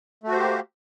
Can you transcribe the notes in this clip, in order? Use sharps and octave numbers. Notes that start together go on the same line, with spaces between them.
A3 A#3 F#4 G4 C5